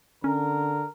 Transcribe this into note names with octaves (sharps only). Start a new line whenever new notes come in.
D3 C#4 A#4